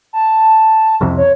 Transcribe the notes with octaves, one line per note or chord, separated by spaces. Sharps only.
A5
C2 F2 C3
C#5